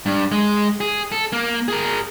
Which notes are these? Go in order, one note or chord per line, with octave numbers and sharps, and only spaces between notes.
G2
G#3
G#4
A4
A#3
G#4 A#4